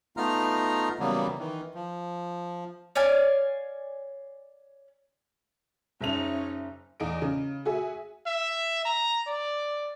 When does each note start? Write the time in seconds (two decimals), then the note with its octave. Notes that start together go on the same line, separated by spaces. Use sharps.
0.17 A3 B3 D#4 F4 A#5 F6
0.99 C#3 E3 F#3 G3 A#3 B3
1.39 D#3 E3
1.75 F3
2.96 C#5 D5 F5 G#5
6.01 F#1 C#4 D#4 E5 F7
7.00 E2 D#5 D7
7.22 C#3
7.65 F#4 G#4 E5 G#5
8.27 E5
8.85 A#5
9.27 D5